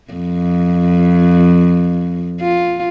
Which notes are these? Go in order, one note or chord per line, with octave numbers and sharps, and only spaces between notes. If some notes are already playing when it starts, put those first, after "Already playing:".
F2
F4